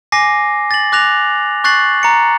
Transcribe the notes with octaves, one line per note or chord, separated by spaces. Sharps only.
G#5 D6 A#6 C7
A6 F#7
D6 F#6 A#6 F7
C#6 F#6 A6 C7 F#7
A#5 C#7